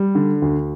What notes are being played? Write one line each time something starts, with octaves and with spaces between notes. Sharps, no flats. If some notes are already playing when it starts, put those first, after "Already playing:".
Already playing: G3
D3
D2